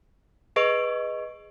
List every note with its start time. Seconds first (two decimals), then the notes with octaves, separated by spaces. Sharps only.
0.56 G#4 B4 D#5 C#6 D7